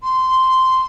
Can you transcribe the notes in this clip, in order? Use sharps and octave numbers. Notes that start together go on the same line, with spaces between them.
C6